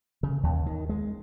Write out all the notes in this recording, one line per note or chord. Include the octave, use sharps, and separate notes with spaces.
C#3
D#2
D#3
G#3